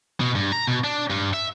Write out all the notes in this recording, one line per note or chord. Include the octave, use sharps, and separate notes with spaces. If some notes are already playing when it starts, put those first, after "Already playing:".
B2
G2
A#5
B2
D4
G2
E5